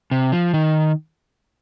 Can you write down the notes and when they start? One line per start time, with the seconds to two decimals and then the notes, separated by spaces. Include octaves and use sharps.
0.11 C3
0.32 F3
0.53 D#3